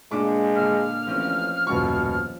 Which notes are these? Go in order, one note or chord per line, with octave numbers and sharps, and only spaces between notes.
A#2 G#3 D4 D6
A#2 D3 F6
A1 F3 C4 C#4
D#1 F#2 B2 C#6